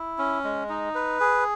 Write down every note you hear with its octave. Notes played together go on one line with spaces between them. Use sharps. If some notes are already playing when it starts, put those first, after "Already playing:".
Already playing: E4
C#4
G#3
D#4
B4
G#4